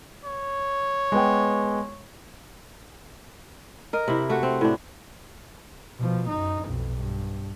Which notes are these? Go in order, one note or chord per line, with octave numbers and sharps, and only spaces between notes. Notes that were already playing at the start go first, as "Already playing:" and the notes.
C#5
G#3 B3 G5
A#4 D#5
C3 E4
A3 F#4
C4
A2 D4
B2 F3
F#2 D#4
B1 F2
G2